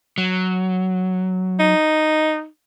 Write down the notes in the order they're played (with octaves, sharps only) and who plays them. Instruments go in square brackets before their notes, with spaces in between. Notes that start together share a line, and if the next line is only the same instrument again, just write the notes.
[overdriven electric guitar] F#3
[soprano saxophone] D#4